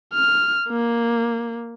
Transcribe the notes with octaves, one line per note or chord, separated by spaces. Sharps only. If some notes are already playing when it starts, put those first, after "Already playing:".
F6
A#3